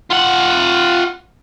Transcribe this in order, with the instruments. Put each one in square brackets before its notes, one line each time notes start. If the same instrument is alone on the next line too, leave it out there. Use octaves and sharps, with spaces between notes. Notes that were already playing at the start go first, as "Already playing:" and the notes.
[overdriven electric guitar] F4 F#5